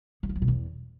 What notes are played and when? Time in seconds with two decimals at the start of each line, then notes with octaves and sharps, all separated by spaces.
0.23 F#3
0.29 F3
0.35 F#3
0.42 B2
0.48 E2